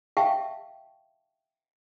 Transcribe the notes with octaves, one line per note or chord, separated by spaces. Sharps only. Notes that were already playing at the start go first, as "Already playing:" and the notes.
E5 F5 G5 A5 C#6